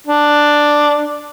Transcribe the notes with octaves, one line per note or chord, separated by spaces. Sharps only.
D4